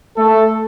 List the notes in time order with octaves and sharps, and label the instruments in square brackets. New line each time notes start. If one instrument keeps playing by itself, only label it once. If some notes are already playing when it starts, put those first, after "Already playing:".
[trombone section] A3 A4